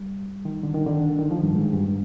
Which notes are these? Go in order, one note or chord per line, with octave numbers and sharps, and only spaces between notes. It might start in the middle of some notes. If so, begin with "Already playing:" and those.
Already playing: G3
D#3
D3
D#3
D3
D#3
F3
G2
G#2
G2